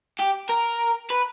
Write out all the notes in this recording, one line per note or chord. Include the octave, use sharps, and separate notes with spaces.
G4
A#4
B4